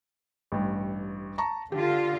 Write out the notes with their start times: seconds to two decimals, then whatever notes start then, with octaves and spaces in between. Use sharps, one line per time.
0.52 A1 G2
1.38 A5 A#5 C#6
1.72 D3 F4 G4